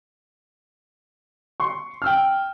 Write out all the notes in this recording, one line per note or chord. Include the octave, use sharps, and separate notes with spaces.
C6 C#6
G5 E6 F6